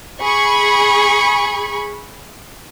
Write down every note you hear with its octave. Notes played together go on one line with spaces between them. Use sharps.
G#4 B5 C#6